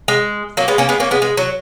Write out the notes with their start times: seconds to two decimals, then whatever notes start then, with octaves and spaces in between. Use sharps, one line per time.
0.08 G#3
0.57 F#3 A#3
0.68 G#3 B3
0.78 A#3 C#4
0.89 G#3 B3
1.00 A#3 C#4
1.11 G#3 B3
1.22 G#3
1.37 F#3